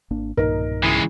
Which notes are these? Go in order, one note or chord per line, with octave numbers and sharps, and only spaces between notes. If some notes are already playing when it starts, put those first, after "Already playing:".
G#1 A#3 D4
B1 G2 A#2 D#3 D#4 A#4
C#3 E3 G#3 E4